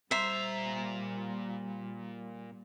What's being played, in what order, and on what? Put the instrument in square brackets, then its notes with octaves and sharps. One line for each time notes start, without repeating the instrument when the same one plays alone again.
[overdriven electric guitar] A#2 A#5 [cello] G3 [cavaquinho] C5 E5